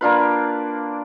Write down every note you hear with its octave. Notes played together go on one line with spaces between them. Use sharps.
A#3 D4 F4 B4